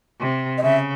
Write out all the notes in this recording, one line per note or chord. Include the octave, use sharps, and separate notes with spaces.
C3
D#5
C#3 E5